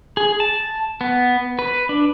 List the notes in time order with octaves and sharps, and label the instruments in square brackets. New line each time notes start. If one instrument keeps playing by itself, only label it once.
[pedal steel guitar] G#4
A5
B3
B4
D4